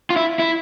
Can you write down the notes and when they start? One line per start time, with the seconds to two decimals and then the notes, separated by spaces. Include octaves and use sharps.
0.10 F4
0.16 E4
0.39 E4